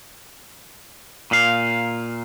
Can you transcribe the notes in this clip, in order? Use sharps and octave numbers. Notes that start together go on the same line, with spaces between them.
A#2 F5